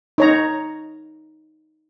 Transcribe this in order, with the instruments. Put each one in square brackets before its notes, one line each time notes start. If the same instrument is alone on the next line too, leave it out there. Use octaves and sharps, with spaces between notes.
[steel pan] D#4 C#5 A#5